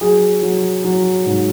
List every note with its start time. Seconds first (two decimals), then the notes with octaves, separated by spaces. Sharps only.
0.01 F#3 G#4
0.42 F#3
0.84 F#3
1.26 G#2